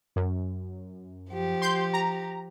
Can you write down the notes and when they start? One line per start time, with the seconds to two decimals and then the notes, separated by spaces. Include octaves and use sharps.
0.16 F#2
1.30 F3 G4
1.62 C6 G6
1.93 A#5